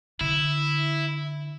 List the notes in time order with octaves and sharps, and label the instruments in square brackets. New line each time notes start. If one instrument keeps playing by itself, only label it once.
[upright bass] D3 [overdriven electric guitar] E4